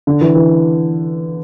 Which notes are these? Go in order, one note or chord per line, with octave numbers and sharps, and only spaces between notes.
D3
E3
E3